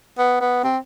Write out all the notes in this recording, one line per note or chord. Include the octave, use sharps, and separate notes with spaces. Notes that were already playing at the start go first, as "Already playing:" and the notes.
B3
B3
C4